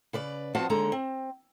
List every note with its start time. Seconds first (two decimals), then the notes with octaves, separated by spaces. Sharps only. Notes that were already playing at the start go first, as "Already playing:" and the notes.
0.13 C#3 B4 D5
0.55 F3 B3 C4 F#4 F5 A5
0.69 D#2 D3 G#3 A4 A#5
0.92 C4